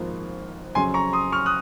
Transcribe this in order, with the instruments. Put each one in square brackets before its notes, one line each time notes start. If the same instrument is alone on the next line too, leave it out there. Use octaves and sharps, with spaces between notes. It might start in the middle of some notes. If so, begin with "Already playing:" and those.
Already playing: [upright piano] G#1 G#2 F3 A#3 F4
[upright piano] F2 C#3 F#3 C#4 [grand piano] G#5 C6
[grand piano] A#5 C#6
C6 D#6
C#6 F6
D#6 F#6